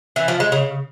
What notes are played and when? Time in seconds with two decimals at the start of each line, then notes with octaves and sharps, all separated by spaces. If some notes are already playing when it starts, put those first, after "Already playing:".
0.16 E3
0.28 F3
0.40 G#3
0.52 C#3